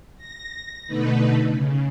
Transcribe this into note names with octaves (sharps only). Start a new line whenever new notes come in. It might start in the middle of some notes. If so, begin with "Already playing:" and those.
A#6
B2 D3 A3 D#4 B4
C#3